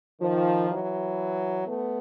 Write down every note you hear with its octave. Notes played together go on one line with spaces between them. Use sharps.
D#3 F3
E3 F#3
A3 B3